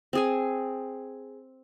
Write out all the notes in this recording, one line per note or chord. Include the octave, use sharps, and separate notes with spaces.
C4 G#4 G#5